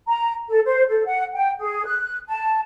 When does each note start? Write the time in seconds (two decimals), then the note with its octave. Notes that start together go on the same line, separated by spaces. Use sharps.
0.07 A#5
0.49 A4
0.65 C5
0.88 A4
1.05 F#5
1.34 G5
1.60 G#4
1.86 F#6
2.28 A5